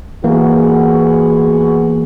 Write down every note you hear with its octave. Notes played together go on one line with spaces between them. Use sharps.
E3 A#3 B3 F#4 G#4